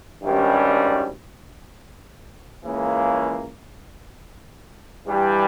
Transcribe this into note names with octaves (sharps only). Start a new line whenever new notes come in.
G#1 G2 D#3 G3 C#4
C#2 C#3 E3 A#3
G2 E3 G3